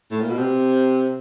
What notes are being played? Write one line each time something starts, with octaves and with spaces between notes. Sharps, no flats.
A2
A#2
B2
C3